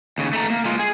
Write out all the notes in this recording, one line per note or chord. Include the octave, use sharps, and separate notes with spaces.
D#2 C#3
A3 A#5
A#3
G#3 F4
G#4